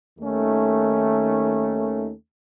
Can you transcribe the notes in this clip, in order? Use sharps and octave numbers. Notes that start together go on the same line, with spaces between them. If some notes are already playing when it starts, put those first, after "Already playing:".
D#2 D#3 A3 C#4